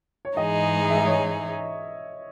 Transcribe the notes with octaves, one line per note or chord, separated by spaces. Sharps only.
C#5
G#2 E3 G#3 D#4 G#4 D#5
E5
D#5
C#5